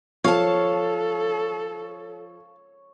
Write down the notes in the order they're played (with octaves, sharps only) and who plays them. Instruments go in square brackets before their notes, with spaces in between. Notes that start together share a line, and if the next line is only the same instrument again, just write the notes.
[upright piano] F3 [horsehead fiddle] A4 [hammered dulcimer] C#5 [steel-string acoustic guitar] F5 A5